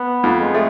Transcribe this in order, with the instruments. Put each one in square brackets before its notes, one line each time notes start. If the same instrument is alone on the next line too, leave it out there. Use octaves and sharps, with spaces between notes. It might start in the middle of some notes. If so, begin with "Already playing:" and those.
Already playing: [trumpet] B3
[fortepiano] F2
[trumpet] G#3
[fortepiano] A3